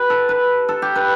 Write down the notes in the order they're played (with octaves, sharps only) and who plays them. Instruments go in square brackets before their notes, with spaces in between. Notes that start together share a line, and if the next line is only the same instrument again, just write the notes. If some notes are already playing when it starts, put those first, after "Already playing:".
Already playing: [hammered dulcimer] G4 B4
A4
B4
A4
G4
B4